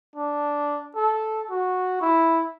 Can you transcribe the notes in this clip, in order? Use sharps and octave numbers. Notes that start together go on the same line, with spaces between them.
D4
A4
F#4
E4